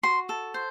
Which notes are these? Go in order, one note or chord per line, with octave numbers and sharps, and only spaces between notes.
F#4 C6
A4
C5